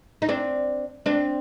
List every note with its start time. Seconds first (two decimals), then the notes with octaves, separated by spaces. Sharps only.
0.22 D#4
0.29 C4 D4
1.06 C4 D4